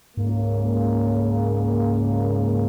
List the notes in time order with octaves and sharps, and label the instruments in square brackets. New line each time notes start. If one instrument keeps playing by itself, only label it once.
[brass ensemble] C#2 C#3 A#3 [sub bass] G#2